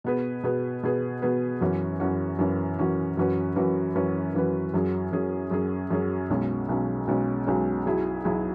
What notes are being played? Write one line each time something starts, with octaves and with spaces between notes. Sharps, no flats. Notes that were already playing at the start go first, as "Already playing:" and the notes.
B2 B3 G#4 B4
B2 B3 G#4 B4
B2 B3 G#4 B4
B2 B3 G#4 B4
F#2 E3 C#4 F#4
F#2 E3 C#4 F#4
F#2 E3 C#4 F#4
F#2 E3 C#4 F#4
F#2 E3 C#4 F#4 B4
F#2 E3 C#4 F#4 B4
F#2 E3 C#4 F#4 B4
F#2 E3 C#4 F#4 B4
F#2 F#3 C#4 G#4
F#2 F#3 C#4 G#4
F#2 F#3 C#4 G#4
F#2 F#3 C#4 G#4
B1 B2 G#3 C#4
B1 B2 G#3 C#4
B1 B2 G#3 C#4
B1 B2 G#3 C#4
B1 B2 F#3 E4 G#4
B1 B2 F#3 E4 G#4